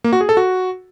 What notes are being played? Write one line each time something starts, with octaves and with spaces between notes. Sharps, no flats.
A#3
F#4
G#4
A4
F#4